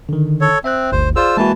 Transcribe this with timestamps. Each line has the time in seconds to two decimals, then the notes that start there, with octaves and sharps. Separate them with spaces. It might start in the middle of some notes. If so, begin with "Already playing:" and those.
0.09 D3 D#3
0.41 A4 C#5
0.64 C4 E5 G5 F#6
0.92 G1 D2 C5
1.16 F4 G#4 C5 D5 E6
1.37 E3 G#3 A#3 F#4 A5